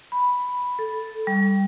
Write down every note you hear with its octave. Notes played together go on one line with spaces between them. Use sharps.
B5
A4
G3